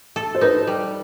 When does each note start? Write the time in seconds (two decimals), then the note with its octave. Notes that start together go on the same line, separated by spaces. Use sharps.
0.16 A4
0.35 C5
0.41 D#4 B4
0.67 G3